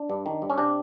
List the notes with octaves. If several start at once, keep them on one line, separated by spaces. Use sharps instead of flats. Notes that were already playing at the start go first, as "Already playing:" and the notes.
Already playing: D4
G2
D#3
G2
C#4
C3 D4